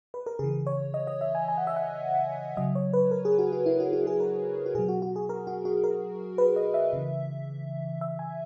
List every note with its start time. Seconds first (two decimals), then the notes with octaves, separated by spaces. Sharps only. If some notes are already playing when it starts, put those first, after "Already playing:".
0.14 B4
0.26 A#4
0.39 C#3 E3 G#4
0.67 C#5
0.94 D#5
1.07 D#5
1.21 E5
1.35 G#5
1.48 G#5
1.58 F#5
1.67 E5
1.76 F#5
2.57 C#3 F#3 D#5
2.75 C#5
2.93 B4
3.11 A#4
3.25 G#4
3.39 F#4
3.52 F#4
3.66 E4
3.80 F#4
3.93 F#4
4.07 G#4
4.20 A#4
4.66 F#4
4.75 B2 G#4
4.79 F#3
4.88 F#4
5.02 F#4
5.16 G#4
5.29 A#4
5.47 F#4
5.65 F#4
5.84 A#4
6.38 B4
6.56 D#5
6.74 E5
6.93 C#3 E3
8.01 E5
8.19 G#5